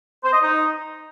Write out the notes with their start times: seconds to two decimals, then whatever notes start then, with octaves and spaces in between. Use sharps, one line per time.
0.23 C5
0.33 D#5
0.42 D#4